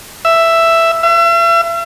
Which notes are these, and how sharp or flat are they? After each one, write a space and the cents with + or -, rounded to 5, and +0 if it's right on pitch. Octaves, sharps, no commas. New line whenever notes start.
E5 +5
E5 +40